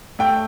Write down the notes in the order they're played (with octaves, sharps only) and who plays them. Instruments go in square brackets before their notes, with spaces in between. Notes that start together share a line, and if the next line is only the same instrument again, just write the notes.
[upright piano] A3 G5